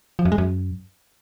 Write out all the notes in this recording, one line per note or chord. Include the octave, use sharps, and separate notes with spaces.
F3
F#2
G#3
F#2